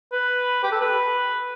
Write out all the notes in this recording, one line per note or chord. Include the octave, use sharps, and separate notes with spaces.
B4
G4
A4
B4